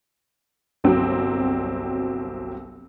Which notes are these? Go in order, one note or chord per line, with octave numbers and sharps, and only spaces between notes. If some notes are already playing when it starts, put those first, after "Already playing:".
G1 C2 F#3 C4